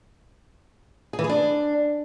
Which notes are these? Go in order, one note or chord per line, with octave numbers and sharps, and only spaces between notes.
G#4
E3
G#4
D4